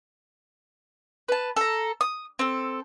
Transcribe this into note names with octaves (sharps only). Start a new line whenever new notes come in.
B4 A5
A4 A#5
D#6
C4 A4